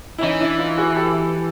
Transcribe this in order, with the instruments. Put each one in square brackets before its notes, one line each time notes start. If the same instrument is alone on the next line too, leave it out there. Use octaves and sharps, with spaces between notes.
[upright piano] E4
[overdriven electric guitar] E3 [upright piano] C#4 D#4
[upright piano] D4 E4
D#4 F4
F#4 G#4
G4 A4